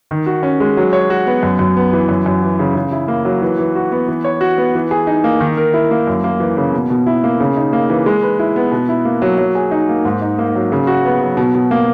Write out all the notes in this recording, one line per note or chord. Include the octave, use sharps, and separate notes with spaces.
D#3
F#4
C#4
G#3
F#3
C#5
F#4
B3
F#2
F#2
B3
E3
F#2
F#2
E3
C#3
C#3
E4
A#3
F#3
E3
E3
F#4
B3
E3
C#5
F#4
B3
E3
G#4
D#4
A#3
D#3
A#4
E4
A#3
F#2
A#3
E3
C#3
B2
B2
E4
A#3
C#3
D#4
A#3
E3
G#3
B4
E4
B3
B2
E4
A#3
F#3
F#3
G#4
D#4
A#3
G#2
D#4
A#3
F#3
C#3
F#4
B3
F#3
B2
B2
A#3